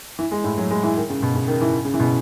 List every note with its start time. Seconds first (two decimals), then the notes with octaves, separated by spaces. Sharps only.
0.19 E3
0.31 G#3
0.44 A2
0.58 F#3
0.70 G#3
0.83 E3
0.97 D#3
1.10 C#3
1.23 B2
1.35 C#3
1.48 D#3
1.61 E3
1.85 C#3
1.94 E3
2.00 B2
2.03 C#3